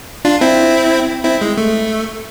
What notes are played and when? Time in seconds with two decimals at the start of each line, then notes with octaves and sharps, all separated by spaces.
0.25 D4 F4
0.41 C4 E4
1.24 C4 E4
1.41 G#3
1.57 A3